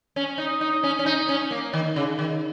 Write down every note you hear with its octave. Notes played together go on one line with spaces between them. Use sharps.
C#4
D#4
D#4
C#4
C#4
D#4
C#4
A#3
D#3
C#3
D#3